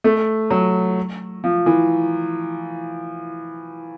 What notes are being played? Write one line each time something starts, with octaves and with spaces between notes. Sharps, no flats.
A3
F#3
F3
E3